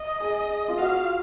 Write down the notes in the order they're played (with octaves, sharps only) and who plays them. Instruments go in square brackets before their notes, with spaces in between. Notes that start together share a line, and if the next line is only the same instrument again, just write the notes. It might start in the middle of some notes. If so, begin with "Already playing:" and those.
Already playing: [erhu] D#5
[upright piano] G#4
F4
[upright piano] F#4 [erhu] F5